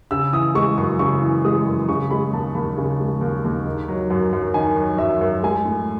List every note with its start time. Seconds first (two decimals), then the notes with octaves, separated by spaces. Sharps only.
0.11 C#3 E6
0.32 E3 D#6
0.55 G#3 C#6
0.77 F#2 C#6
0.99 C#3 C#6
1.22 E3
1.44 G#3 D#6
1.67 F#2
1.88 C#3 C#6
2.11 G#3 B5
2.33 D#2 A5
2.55 D#2 B5
2.78 C#3
3.00 G#3
3.21 D#2
3.44 D#2
3.65 D#3
3.88 F#3
4.10 F#2
4.33 F#2
4.54 D#3 G#5
4.76 F#3
4.98 F#2 E5
5.21 F#2
5.43 G#3 G#5
5.65 A2